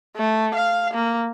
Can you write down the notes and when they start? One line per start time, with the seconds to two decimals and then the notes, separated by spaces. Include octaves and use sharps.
0.16 A3
0.55 F5
0.94 A#3